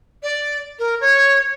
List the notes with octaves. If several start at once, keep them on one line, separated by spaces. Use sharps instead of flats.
D5
A#4
C#5